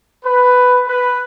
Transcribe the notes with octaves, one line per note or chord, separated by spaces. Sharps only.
B4
B4